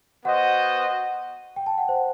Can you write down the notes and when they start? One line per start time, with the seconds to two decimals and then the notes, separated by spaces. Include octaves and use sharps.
0.25 B3 F#4 C5 D#5 F#5
1.56 G5
1.66 A5
1.78 F#5
1.89 C5